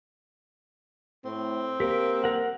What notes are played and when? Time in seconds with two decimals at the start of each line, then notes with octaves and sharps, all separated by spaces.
1.25 A2 C4
1.80 A#3 G4 A#4
2.24 A#4 F#5